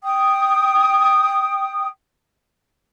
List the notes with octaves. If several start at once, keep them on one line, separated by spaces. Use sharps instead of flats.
G5 D#6